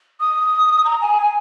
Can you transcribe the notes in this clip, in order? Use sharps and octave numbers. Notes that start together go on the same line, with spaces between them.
D#6
A#5
G#5
G#5